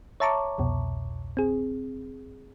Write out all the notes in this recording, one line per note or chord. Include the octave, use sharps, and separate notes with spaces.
C#5 E5 A5 A#5 C#6 D6
C2 F2 B2
C4 G#4